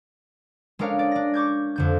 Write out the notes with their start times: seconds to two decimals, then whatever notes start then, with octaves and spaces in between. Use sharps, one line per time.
0.79 G#3 C#4 D4 A#4 C#5 F5
0.99 D5
1.11 D4 A#6
1.34 C#6 D6 G6 G#6
1.76 F2 D3 G6